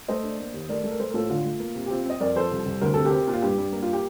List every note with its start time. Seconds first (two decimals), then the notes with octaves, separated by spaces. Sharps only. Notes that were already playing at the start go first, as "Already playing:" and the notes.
0.08 A3 C5 D#5
0.23 D4
0.39 A#3
0.54 D#2
0.69 A3 A#4 D5
0.84 A3
0.91 A#4
0.99 A3 A4 C5
1.10 A#4
1.14 A2 F4 A4
1.30 D3 F4
1.45 A3
1.60 A#3
1.75 C3
1.86 G4
1.90 C4 F4
2.05 C4 D#5
2.20 F2 A#4 D5
2.36 F3 A4 C5
2.52 C2
2.66 C2
2.81 D2 A#4
2.94 C3 A4
3.05 G4 A#4
3.11 C4
3.27 A#2
3.33 F4
3.42 G2 G4
3.58 G2
3.72 A#3
3.82 F4
3.93 G4